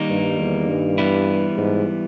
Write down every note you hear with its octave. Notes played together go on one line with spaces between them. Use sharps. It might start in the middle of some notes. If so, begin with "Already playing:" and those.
Already playing: D#3 G3 A#3 D#4
G2
E2
G2
E3 G3 B3 E4
G#2